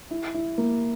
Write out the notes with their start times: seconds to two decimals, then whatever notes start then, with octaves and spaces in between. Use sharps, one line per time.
0.11 E4
0.34 E4
0.58 A#3